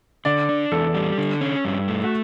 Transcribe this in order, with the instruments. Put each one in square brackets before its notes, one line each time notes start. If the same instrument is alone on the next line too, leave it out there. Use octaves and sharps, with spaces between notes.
[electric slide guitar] D3 [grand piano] D5
[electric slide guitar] D4
[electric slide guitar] E2 [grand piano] A4
[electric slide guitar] G3
D3
C#4
G2
A3
[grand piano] F#4